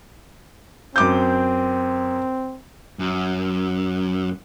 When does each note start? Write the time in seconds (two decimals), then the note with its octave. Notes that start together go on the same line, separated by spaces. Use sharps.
0.96 F#2 C4 D6 G6
2.99 F#2